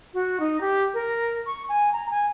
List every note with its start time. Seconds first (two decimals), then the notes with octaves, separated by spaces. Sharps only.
0.14 F#4
0.40 D#4
0.61 G4
0.94 A#4
1.46 C#6
1.69 G#5
1.93 A#5
2.11 G#5